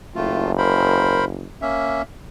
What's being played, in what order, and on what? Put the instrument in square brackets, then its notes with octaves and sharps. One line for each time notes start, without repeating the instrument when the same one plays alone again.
[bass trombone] F#1 [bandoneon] A2 A3 F4
[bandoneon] A#4 C5 B5
A#3 C#4 E5